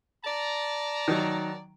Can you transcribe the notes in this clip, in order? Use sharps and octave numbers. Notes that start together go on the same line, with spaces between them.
D5 A5 A#5
D#3 F#3